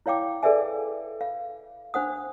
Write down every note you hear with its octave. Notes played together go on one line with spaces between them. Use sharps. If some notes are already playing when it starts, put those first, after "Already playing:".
E4 C#5 F5 G5 D6
G#4 A4 B4 D5 E5 G#5
F5
D4 C5 F#5 D#6